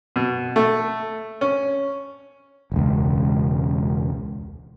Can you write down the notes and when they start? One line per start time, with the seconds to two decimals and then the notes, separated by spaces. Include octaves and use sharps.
0.16 B2
0.56 A3
1.41 C#4
2.72 E1 C#2